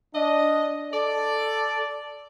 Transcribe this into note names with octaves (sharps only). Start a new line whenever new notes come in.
D4 D#5
A4 D5